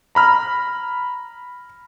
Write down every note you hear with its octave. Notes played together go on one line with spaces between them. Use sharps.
A#5 B5 F6